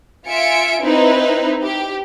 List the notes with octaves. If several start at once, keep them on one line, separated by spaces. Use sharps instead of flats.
F4 E5 G#5 C#7 D7
C4 D#4 E4 B4
G4